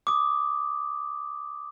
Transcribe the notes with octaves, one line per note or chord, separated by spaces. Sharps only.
D6 D#6